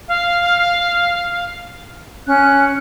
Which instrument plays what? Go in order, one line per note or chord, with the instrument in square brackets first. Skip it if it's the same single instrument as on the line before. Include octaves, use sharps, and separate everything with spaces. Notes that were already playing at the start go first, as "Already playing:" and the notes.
[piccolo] F5
[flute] C#4 [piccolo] F#6